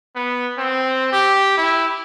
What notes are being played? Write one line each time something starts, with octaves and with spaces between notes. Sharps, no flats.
B3
C4
G4
E4